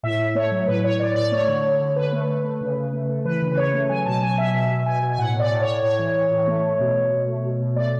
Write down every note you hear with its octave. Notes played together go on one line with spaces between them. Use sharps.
A2 E5
A2
A3 C#5
F#3
A2 B4
A2 C#5
A2 D5
A2 D5
A3 C#5
D3
D3
D3
D3 B4
A3
A3
A3
C#3
C#3
A3
A3
E3 B4
C#3
B4
C#3 C#5
A3
F#3 G#5
B2 A5
F#3 G#5
B2 E5
B2 E5
B2
B2 G#5
B2
G#5
A2 F#5
A2 D5
A2
C#5
A2
A2 C#5
E3
E3
A2
A3
A3
B2
B2
B2
A3
B2
B2
A3 D5